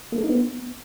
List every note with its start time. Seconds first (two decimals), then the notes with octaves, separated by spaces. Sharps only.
0.12 A#3
0.18 A4
0.24 D#4
0.30 B3